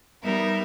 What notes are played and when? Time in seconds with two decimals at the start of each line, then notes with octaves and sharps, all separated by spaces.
0.22 G3 B3 D#4 A#4 E5